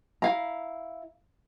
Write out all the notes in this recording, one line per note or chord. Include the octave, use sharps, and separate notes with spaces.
E4 F5 A#5